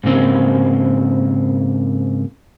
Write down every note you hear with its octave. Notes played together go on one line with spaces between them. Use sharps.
G#2 C#3 A#3 C4